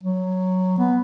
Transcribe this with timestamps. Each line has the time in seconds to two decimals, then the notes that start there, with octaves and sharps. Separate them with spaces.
0.03 F#3
0.79 B3